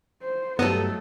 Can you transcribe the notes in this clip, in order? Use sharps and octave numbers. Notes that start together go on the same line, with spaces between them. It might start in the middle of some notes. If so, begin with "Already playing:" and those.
C5
G2 F#3 A3 B3 G4 A4 D#5